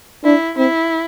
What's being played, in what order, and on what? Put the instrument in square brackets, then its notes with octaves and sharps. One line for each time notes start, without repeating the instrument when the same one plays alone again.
[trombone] D4 [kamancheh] E4
[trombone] C4 [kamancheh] E4